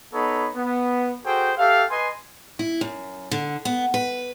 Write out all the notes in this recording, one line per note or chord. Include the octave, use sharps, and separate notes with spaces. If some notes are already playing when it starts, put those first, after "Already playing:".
B3 D#4 A4 C#5 B5
B3
F#4 G#4 A4 C5 G5
G4 A4 E5 F5
B4 D#5 G#5 C6
E4
F#2
D3
B3
B4